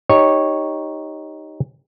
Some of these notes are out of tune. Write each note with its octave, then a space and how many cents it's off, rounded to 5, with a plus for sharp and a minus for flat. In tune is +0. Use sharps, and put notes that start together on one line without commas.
D#4 +0 G4 +0 C#5 -10